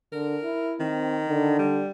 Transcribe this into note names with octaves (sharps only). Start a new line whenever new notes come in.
D3 A#4
E4
D#3 C4
D3
G3